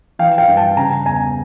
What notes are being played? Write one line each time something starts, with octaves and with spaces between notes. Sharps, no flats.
E3 F5 G5
F5 G5
G2
G5 A5
C#3 G#5 A#5
E2 G#5 A#5